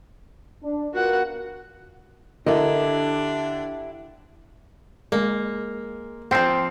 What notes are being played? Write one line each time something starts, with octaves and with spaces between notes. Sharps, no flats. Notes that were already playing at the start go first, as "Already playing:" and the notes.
D4
B3 F4 F#4 A#4 F#5
D3 D4 E4 G4 A#4 D#5
G#3 A#3
F3 C4 G5 C7